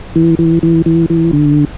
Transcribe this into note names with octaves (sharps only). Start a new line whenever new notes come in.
E3
E3
E3
E3
E3
D3